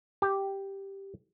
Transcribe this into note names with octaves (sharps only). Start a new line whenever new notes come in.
G4